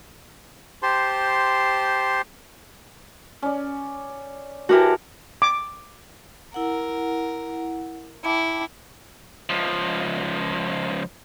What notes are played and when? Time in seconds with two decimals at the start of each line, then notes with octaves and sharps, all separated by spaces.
0.82 G4 C5 A5 C6
3.42 C#4 D5
4.69 E3 F#4 G4 A#4 A5
5.42 D6
6.54 E4 A#4 F#5
8.24 E4 G5 A5 D6
9.49 C#2 F3